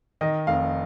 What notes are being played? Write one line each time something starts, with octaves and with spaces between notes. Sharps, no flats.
D#3 D#5
F1 F5